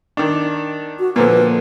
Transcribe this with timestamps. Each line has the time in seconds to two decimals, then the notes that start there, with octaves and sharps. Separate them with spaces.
0.17 D#3 D4
0.99 F#4
1.16 A#2 D3 F3 B4